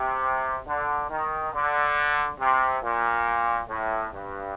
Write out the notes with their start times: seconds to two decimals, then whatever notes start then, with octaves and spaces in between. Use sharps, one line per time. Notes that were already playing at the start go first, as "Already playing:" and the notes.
Already playing: C3
0.67 D3
1.10 D#3
1.53 D3
2.40 C3
2.83 A#2
3.69 A2
4.13 G2